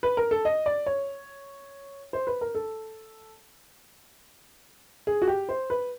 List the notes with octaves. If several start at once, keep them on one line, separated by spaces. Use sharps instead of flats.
B4
A#4
A4
D#5
D5
C#5
C5
B4
A#4
A4
G#4
F#4
G4
C5
B4